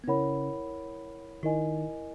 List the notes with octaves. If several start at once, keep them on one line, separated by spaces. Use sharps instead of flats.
B3
C#3 C#4 E4 A#4 C#5 F#5 B5
D#3 D#4 E4 A#4 D#5 G#5